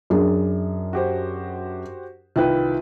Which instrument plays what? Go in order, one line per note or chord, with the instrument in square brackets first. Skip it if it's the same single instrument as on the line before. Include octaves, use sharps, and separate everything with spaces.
[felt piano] F#2 D4 G#4
[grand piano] F#4 G4 C5
[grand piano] C2 D#3 B4 [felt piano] F4 G5